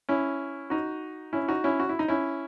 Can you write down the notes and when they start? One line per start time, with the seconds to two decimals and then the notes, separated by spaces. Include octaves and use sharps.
0.09 C#4 E4
0.70 D#4 F#4
1.33 C#4 E4
1.48 D#4 F#4
1.64 C#4 E4
1.80 F#4
1.89 E4
1.99 D#4
2.08 C#4 E4